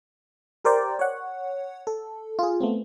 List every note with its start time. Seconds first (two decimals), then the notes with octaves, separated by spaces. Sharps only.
0.65 G4 A#4 C5 D5 G5
0.99 C#5 F#5
1.87 A4
2.39 F4 G#4
2.60 A3 B3 C4